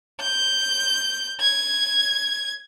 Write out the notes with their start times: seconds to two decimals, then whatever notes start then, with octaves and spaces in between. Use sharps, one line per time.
0.21 G6
1.41 G#6